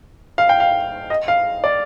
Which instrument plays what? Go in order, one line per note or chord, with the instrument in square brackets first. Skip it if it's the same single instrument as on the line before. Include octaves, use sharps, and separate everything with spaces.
[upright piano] F5
G5
F5
D#5
F5
D5